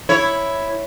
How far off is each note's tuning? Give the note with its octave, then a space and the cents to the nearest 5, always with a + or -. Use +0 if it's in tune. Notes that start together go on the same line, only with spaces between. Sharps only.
E4 +0 C#5 +0